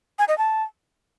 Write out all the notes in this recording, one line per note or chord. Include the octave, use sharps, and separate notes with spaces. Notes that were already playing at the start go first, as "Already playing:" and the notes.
G#5
D#5
A5